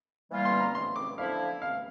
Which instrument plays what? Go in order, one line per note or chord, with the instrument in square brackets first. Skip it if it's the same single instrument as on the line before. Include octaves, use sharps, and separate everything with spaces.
[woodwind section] E3 G3 A#3 F4
[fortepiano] C6
A#5
C6
D6
[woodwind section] D3 F3 A#3 E4 [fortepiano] F5
[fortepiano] F5